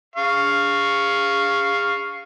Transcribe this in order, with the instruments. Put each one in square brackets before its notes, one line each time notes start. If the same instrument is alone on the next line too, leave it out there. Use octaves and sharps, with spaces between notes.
[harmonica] F5 C#6